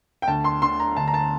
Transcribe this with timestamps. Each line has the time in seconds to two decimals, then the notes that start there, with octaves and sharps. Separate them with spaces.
0.22 G5
0.27 D2 A5
0.44 C6
0.62 D3 C6
0.80 A#5
0.96 D2 A5
1.08 A#5
1.14 A5